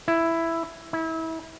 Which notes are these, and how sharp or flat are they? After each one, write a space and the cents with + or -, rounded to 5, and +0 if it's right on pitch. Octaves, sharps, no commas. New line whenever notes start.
E4 +5
E4 -30